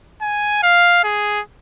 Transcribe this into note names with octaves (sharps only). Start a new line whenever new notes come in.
G#5
F5
G#4